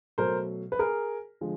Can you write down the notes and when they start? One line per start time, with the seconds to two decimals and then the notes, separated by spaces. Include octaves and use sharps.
0.18 B2 F#3 A3 A#4 C5
0.72 B4
0.79 G#4 A#4
1.41 D3 F3 G#3